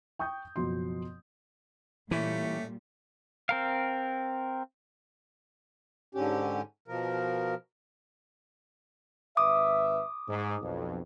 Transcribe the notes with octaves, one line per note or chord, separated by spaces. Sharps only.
G5 C#6 D#6 G6
F#1 B2 F3 F#3 C6
A#2 E3 G3 A3 C#4 G4 E5
C4 A#4 F5
G#2 D3 C#4 G4
B2 F3 A#4
G#1 B4 E5 D6 D#6
G#2
B1 F2